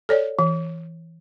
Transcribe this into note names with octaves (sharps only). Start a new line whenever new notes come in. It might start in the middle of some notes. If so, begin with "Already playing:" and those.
A4 C#5 D5
E3